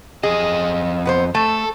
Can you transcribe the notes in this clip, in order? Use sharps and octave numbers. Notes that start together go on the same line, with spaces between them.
F2 G#4 D#5
B3 B4 C5
A3 A4